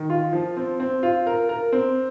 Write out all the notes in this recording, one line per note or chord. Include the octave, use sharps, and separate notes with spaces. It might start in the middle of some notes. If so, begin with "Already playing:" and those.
Already playing: D#3
F4
F3
C4
C4
F4
A#4
A#4
C4